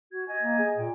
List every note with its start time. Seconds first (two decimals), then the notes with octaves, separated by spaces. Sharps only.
0.11 F#4 G#6
0.27 D#5 G#5 G#6
0.42 A#3
0.59 G#4
0.77 A#2 G5